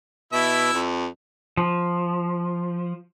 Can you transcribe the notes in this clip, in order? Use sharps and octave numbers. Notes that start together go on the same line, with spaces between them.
B2 E4 E5
F2
F3